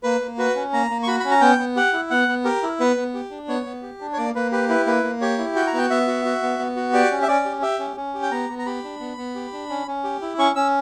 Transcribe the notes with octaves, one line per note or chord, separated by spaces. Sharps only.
A#3 B4
A#3
F#4 B4
C#4
A#3 A#5
A#3
C#6
F#4 B5
B5
C#4
A#5
B3 G5
B3
G4 F#5
E4
B3 F#5
B3
G4 A#4
E4
B3 B4
B3
G4
D4
B3 C#5
B3
G4
D4
C#5
A#3 D5
A#3 B4
G4 B4
E4 B4
A#3 B4
A#3
G4 C#5
E4
F#4 G5
A#5
B3 G5
B3 E5
F#4
F#4
B3
B3
F#4
G4 D5
C#4
E5
C#4 D5
G4
G4 E5
C#4
C#4
G4
G5
B3 A#5
B3
A#5
G4 B5
D4
B3
B3
G4
D4
C#4
C#4
G4
E4
C#4 C#6
C#4 E6